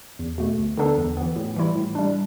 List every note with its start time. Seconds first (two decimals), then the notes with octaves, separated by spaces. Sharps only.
0.19 E2
0.38 B2 A3
0.59 D2
0.77 D3 B3 D4 A4
0.98 E2
1.17 E3 B3
1.36 A2
1.56 E3 G3 E4
1.75 A2
1.95 G3 D4